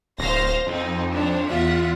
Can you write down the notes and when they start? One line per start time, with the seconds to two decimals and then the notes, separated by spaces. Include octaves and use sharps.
0.18 D1 C5 F5 A#6
0.67 F2 C4 D#4
1.13 D4 C5 C#5
1.50 E2 F4 E5 F#5